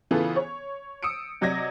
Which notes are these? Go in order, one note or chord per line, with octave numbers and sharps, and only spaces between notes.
C#3 E3 B3 F4 A4
C#5
D#6 E6 C#7 D7
C3 F#3 D5 D#5 G#6 A#6